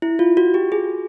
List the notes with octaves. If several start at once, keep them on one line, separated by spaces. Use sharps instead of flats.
E4
F4
F#4
G4
G#4